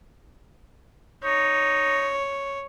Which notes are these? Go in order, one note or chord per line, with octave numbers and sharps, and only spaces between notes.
D#4 C#5